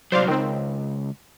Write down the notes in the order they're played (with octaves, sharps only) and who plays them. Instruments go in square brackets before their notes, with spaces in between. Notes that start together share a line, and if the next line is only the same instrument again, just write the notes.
[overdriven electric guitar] C2 F#3 [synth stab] C5 D5 F5
[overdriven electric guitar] C#2 [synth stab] D#3 C4